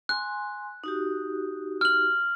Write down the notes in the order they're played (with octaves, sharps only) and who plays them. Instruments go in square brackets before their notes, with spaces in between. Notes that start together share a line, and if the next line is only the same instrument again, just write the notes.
[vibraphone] G#5 C6 [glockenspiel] F#6
[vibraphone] D#4 F#4 G4
[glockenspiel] F6 F#7